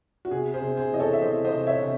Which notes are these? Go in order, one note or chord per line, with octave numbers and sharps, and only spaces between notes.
F#4
C3 G#4
G#4 C5
C3
G#4 C5
E3 D#5
A4 C#5
E5
E3 C5 D#5
C5 D#5
C3
C#5 E5
C3